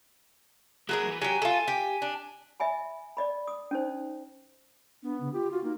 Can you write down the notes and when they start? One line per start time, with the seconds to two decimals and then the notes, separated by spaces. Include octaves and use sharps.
0.89 F#3 A#3 G#4 A#4 F#5
1.07 E3 B4
1.22 F#3 G4 G#5
1.42 F4 A4
1.68 G4
2.02 D4
2.60 D#5 E5 G#5 B5
3.17 D5 D#5 B5
3.47 D#6
3.71 C#4 D#4 C5
5.03 B3 D4
5.20 C#3
5.33 F4 G4
5.51 F4 F#4
5.64 A#3 D#4